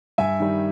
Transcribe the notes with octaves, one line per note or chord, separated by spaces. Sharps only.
G2 E5 G#5
D#3 G3